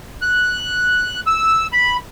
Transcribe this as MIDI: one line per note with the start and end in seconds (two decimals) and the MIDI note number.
0.22 1.20 90
1.27 1.67 88
1.73 1.97 83